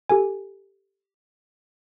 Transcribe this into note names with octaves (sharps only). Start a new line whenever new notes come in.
G4 A4 G#5